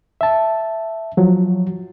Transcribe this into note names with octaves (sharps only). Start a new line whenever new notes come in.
E5 A5
F3 F#3